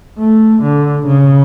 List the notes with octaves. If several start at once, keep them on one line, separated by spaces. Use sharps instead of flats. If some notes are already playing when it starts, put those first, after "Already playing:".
A3
D3
C#3